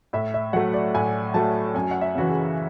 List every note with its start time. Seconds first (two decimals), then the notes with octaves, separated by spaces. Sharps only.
0.13 A2 E5
0.34 E5
0.53 F#3 A3 F#5
0.74 D5
0.94 A2 G#5
1.34 F#3 A3 A5
1.74 F#2 G#5
1.91 F#5
2.01 E5
2.15 C#3 E3 F#4
2.29 G#4